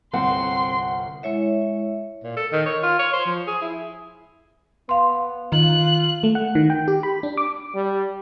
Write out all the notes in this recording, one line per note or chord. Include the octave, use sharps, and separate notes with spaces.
G1 C2 C4 F#5 C6
G#3 E4 C#5 E5
A#2
A4
D#3
C#5
F4
C#5
C5
F3
G#4
E4
B3 F5 C6
D#3 F4 F#6
A3
F#5
D#3
G5
G4
B5
D4
D6
G3